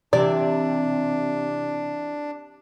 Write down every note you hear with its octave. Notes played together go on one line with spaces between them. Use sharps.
C3 E3 D4 G4 D5 E5